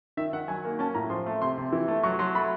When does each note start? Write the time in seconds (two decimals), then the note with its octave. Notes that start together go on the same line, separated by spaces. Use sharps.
0.17 D#3 E5
0.33 D#3 F#5
0.48 F#3 G#5
0.65 A#3
0.79 C#4 A5
0.95 A2 A#5
1.10 F3 C6
1.26 A3
1.42 C3 C6
1.58 C3
1.72 E3
1.88 A3
2.03 F#3 C#6
2.19 F#3 C6
2.35 A3 B5